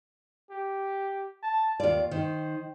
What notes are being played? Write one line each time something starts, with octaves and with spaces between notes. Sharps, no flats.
G4
A5
D#2 F4 D5
D#3 C5